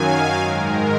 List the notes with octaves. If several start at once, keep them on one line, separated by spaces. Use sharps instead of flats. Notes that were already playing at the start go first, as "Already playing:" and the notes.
Already playing: F#2 D#3 F#3 F5 G#5
G#2 D#3 G#3 A#4